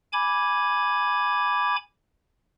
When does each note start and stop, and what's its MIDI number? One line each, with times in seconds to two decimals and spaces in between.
0.13 1.76 80
0.13 1.76 83
0.13 1.76 86
0.13 1.76 92